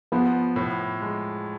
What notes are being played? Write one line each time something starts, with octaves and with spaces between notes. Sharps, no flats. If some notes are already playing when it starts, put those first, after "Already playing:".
F3 B3
A2
G#3